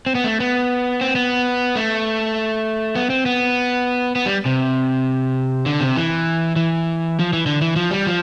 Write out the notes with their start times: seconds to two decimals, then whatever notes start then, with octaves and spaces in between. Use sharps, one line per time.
0.06 C4
0.15 B3
0.24 A3
0.40 B3
1.01 C4
1.15 B3
1.76 A3
2.95 B3
3.10 C4
3.26 B3
4.16 B3
4.26 G3
4.46 C3
5.66 D3
5.81 C3
5.96 E3
6.56 E3
7.19 F3
7.33 E3
7.46 D3
7.61 E3
7.76 F3
7.91 G3
8.07 F3